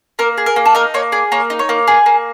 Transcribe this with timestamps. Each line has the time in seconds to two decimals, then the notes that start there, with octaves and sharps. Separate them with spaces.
0.19 A#3 A#4
0.38 G#4
0.46 A#4
0.56 A#3
0.65 A4
0.75 D#4 A#4
0.94 A#3 C#5
1.12 G#4 D5
1.32 A#3 C#5
1.50 D#4
1.59 C#5
1.69 A#3
1.87 G#4
2.06 A#3